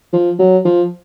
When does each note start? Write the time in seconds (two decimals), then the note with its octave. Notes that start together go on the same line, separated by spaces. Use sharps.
0.13 F3
0.39 F#3
0.65 F3